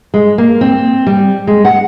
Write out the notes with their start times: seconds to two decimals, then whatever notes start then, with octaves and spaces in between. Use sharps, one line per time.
0.14 G#3
0.38 A#3
0.61 C4
1.07 G3
1.47 G#3
1.65 F#5